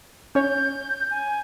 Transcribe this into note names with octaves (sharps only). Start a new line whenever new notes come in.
C#4 C#5 G6
G#5